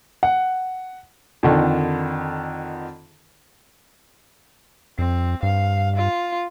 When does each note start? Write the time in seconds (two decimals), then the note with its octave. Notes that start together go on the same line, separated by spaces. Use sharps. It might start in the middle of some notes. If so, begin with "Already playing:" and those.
0.23 F#5
1.43 F2 D3 D#3
4.99 F2 C4
5.43 G2 F5
5.97 F4